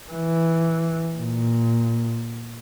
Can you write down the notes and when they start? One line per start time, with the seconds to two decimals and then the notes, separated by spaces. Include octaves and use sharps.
0.11 E3
1.16 A#2